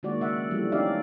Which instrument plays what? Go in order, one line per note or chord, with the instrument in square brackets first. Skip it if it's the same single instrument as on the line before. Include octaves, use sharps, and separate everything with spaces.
[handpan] D#3 G#3 A#3 F#4 D5
C#3 E5 F#5
E3 F3 G3 A3
C#4 D#4 G4 D5 E5 F5